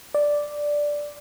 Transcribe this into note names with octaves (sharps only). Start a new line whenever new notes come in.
D5